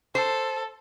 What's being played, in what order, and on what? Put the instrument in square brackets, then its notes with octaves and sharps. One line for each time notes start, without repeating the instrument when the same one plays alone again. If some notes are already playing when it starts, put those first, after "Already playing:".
[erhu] A4 [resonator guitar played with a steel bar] C5